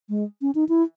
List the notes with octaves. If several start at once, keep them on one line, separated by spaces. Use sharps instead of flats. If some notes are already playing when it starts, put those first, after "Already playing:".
G#3
C#4
D#4
E4